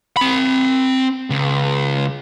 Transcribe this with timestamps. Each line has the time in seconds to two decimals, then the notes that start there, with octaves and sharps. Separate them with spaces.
0.17 C4 B5
1.30 C#2